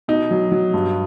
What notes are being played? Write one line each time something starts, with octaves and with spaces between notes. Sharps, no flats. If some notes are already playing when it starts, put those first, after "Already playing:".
B2 D#4
F#3
F#3
G2